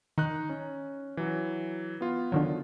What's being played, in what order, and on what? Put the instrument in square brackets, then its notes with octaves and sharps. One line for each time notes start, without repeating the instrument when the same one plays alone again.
[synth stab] D#3 [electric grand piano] D#4 F#6
[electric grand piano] C#4
E3 F#3
B3 F4
[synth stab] D3 D#3 F#3